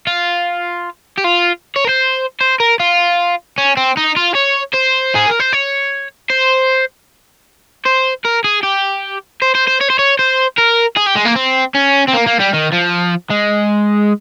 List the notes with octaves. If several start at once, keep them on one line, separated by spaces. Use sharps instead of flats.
F4
G4
F4
C#5
A#4
C5
C5
A#4
F4
C#4
C4
D#4
F4
C#5
C5
G#4
A#4
C5
C#5
C5
C5
A#4
G#4
G4
C5
C5
C5
C#5
C5
C#5
C5
A#4
G#4
G4
G#3
A#3
C4
C#4
C4
A#3
A#3
G3
D#3
F3
G#3